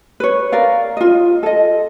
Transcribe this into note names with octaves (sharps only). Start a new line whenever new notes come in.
B4 C#5
A#4 D5 F5
F4 D#5
A4 D#5